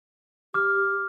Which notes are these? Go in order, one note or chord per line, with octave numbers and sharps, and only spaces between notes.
G4 D6 F6